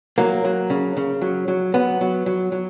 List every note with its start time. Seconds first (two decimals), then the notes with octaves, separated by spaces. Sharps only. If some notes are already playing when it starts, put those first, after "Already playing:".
0.18 F#3 A#3
0.44 F#3
0.70 C#3
0.97 C#3
1.22 F#3
1.48 F#3
1.74 F#3 B3
2.01 F#3
2.26 F#3
2.52 F#3